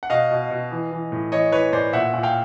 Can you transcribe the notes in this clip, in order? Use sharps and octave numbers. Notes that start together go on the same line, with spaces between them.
F#5
B2 D#5 F5
B2
B2
E3
E3
A2
E3 C#5 D#5
E3 B4 C#5
A2 C5 D5
A#2 E5 F#5
A#2
F5 G5